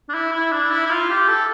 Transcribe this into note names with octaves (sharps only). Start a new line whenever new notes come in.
D4
E4
E4
D4
E4
E4
F4
G4
A4